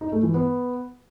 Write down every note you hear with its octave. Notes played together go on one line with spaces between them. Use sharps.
D#4
A3
E3
B3